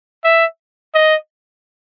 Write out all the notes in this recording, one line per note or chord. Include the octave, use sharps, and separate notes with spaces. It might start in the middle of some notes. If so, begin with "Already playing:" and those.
E5
D#5